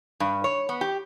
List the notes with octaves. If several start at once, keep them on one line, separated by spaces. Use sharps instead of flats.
G2
C#5
B3
G4